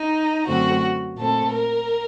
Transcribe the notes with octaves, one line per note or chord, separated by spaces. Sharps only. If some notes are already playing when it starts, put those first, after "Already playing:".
Already playing: D#4
F#2 D3 A3 C4 F#4
A#2 A3 C4 A4
A#4